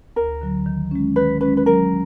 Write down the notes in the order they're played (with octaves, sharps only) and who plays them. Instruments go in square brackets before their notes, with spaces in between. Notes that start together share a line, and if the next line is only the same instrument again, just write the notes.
[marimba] D2 [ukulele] A#4
[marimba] D3 F#3
D#3
G#3 C#4
[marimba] D#3 [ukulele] B4
[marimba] G#3 C#4 [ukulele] B4
[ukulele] B4
[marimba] F#3 [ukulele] A#4